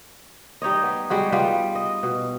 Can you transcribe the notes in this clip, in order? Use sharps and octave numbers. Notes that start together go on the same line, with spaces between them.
G3 D#4 C#5 D#5
B3
G3 G#3 F#4
G3 B3 F4
D#5
B2